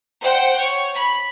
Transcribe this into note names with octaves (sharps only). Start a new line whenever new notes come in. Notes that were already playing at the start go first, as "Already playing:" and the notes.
C5 F#5 G5
C#5
B5